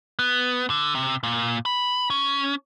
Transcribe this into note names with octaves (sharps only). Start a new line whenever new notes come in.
B3
D3
C3
A#2
B5
C#4